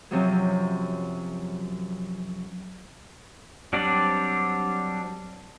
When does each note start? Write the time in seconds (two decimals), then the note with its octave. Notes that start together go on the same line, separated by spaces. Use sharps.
0.11 F#2 C3 F3 F#3
3.73 F#3 G3 C4 D4 D5